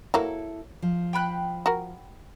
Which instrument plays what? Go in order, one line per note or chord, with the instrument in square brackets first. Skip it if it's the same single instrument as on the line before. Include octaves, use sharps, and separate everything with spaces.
[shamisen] E3 F#3 A#3 [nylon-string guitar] E4 A4
[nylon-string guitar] F3
[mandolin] G5 B5 F#6
[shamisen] F#4 A#4